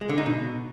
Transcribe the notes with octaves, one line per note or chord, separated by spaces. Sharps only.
G#3
D3
D#4
B2